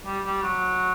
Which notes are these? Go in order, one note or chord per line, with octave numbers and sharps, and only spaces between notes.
G3
G3
F#3